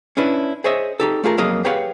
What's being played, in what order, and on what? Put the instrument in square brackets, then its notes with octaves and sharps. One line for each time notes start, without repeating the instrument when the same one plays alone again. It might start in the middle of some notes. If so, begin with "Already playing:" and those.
[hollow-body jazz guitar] C#4 D4 E4 B4
G#4 C5 C#5 D#5 E5
D#4 G4 A4
A3 F4 G#4 A#4
F2 F#3 A#3 G#4 D#5
G4 G#4 B4 C#5 F5 F#5